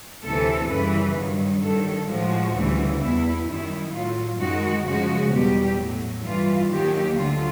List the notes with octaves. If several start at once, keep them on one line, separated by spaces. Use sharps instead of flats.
D2 C3 E3 A4
F#2 C#3 E3 G3 B4
G2 D#3 F#3
G2 D#3 F#3 A4
A2 F3 G#3 F#4
D2 C#3 E3 G3
E2 B2 G3 E4
F#2 D#3 G3 E4
A2 F#3 F4
F#2 D#3 G#3 F#4
F#2 C#3 F3 G#3 F#4
E2 B2 G3 G4
A2 F#3
G2 E3 G3 F4
D#2 D#3 F#3 G4
D2 D3 F#3 F4